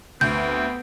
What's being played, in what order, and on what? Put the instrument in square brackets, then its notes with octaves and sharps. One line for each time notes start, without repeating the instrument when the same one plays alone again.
[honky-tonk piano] D2 [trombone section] B3 [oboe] C4 [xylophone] G6